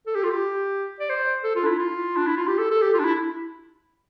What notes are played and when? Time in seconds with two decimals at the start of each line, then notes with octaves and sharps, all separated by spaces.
0.06 A4
0.15 G4
0.23 F4
0.31 G4
1.00 D5
1.09 C5
1.44 A4
1.55 F4
1.63 D4
1.66 E4
1.78 F4
2.17 D4
2.27 E4
2.37 F4
2.47 G4
2.58 A4
2.71 A4
2.82 G4
2.94 F4
2.99 D4
3.05 E4